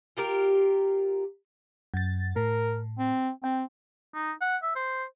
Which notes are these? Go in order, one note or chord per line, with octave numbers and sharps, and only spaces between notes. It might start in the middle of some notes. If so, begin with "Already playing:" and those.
F4 G4 A#4
F#2 A6
A2 A#4
C4
C4 G5
D#4
F#5
E5
C5